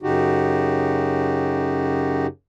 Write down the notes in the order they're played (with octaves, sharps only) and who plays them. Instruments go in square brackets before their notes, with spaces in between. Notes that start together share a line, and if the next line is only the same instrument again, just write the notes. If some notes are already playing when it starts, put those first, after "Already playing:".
[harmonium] F#2 C#3 D#4 F#4 G4